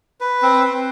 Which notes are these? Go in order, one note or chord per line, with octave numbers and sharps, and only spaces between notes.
B4
C4
C4